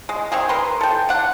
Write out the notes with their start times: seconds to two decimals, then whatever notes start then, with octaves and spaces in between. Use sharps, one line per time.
0.09 G#3
0.32 D#3 C4 G#4
0.49 A#4 B4 C6
0.81 A4 G5
1.09 D4 F#5